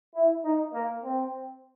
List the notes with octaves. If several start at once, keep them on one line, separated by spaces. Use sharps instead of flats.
E4
D#4
A#3
C4